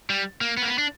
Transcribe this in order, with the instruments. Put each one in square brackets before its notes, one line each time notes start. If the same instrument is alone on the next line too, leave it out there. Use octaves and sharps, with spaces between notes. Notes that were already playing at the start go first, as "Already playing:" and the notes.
[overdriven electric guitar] G3
A#3
B3
A#3
B3
D4